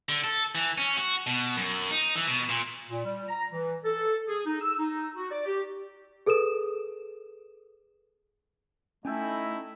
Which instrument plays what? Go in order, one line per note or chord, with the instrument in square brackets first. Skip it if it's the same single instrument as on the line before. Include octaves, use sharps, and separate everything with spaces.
[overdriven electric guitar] D3
A4
E3
C#4
F#4
B2
F#2
D#4
E3
B2
A#2
[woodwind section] A#2
G3
A#5
E3
A4
G#4
D#4
E6
D#4
F#4
D5
G4
[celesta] G#4 A4 B4 D#6 E7
[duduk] A3 [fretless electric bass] C#4 [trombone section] D#4 E4 [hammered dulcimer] A4 G5 G#5